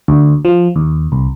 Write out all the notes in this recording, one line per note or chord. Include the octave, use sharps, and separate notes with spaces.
D2
F3
D#2
C2